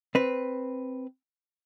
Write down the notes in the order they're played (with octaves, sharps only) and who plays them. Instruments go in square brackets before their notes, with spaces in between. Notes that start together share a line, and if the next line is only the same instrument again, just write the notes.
[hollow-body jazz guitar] C4 B4